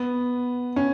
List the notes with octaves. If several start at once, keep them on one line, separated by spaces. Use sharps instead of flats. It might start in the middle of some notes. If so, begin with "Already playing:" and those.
Already playing: B3
C#4